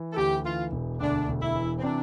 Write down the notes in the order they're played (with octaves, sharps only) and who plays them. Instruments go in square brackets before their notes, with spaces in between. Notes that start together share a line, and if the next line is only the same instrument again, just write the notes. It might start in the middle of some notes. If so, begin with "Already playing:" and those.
Already playing: [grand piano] E3
[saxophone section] A4
[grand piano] D2 [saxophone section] G4
[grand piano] E3 [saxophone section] F4
[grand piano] E1
[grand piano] D2 [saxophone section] D4
[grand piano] E1
[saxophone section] E4
[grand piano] E3
[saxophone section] C4
[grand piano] C3 [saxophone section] D4